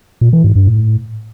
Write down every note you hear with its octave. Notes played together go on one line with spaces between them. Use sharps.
A#2
E3
G#2
G2
A2